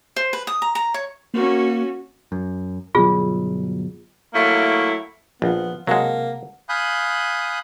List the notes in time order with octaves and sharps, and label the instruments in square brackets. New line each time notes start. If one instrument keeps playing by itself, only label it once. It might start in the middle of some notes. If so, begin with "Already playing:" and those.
[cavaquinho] C5
B4
D#6
A#5
A#5
C#5
[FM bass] A#3 [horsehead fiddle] C#4 F#4
[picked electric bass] F#2
[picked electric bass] G1 B2 F#3 [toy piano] F4 G#4
[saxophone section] F#3 A3 A#3 E4
[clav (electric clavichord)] A#1 [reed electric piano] F3 [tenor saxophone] B3 [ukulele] F4
[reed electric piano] C3 [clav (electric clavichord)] F#3 G#3 [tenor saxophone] A#3 [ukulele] F#5 A5 A#5
[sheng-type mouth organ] F5 G#5 B5 D#6 F#6 G6